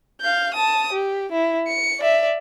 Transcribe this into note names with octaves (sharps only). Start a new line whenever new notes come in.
F5 G6
A5 D#6
G4
E4
C#7
D5 E5